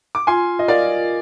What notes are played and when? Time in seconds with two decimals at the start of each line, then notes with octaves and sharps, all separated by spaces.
0.15 D6
0.27 F4 G#5 C6
0.59 D#5
0.68 A#4 D5 F5